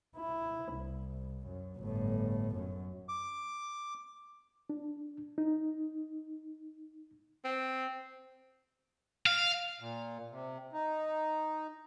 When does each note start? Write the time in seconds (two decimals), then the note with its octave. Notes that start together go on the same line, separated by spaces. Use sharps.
0.16 E4
0.72 C2
1.46 F#2
1.78 G1 A2
2.55 F#2
3.09 D6
4.70 D4
5.38 D#4
7.44 C4
9.26 F5
9.80 A#2
10.31 C3
10.73 D#4